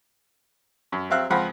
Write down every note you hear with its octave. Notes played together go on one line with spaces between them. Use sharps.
F#2
F#3 C4 E5 F5 F#6
C#2 F3 C4 F5 F#5 B5